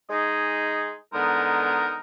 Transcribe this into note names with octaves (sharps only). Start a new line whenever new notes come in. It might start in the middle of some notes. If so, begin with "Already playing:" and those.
G#3 D#4 G#4
D3 G#3 B3 D#4 A#4